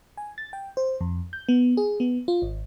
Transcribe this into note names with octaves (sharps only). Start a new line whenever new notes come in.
G#5
A6
G5
C5
F2
G6
B3
G#4
B3
F4
G#1